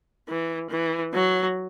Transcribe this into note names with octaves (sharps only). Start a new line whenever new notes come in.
E3
E3
F#3